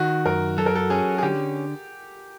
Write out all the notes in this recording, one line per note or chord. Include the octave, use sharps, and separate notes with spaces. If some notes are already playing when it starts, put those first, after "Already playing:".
Already playing: D#3 F#4
F#2 A#4
F#3 A4
A#4
A4
C#4 G#4
G#4
D3 G4